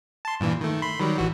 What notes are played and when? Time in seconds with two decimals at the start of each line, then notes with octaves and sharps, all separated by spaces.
0.25 A5 C6
0.40 G2 A#2 E3
0.61 D#3 A3
0.82 B5 C6
1.00 D#3 F#3 G3
1.18 A1 E3 F#4